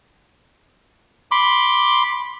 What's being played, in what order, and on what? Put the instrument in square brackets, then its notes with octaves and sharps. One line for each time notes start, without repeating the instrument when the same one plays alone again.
[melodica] B5 C6 D6